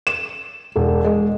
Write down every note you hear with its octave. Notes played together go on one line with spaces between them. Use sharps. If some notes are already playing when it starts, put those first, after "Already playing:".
E7
E1
G#3